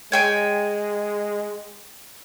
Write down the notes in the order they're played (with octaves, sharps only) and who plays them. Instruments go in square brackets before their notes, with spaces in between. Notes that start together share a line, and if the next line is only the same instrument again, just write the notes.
[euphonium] G#3 [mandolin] C#5 G5 G#5